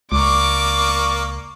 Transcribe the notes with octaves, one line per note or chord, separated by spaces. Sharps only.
C#2 A#3 D5 C#6 D6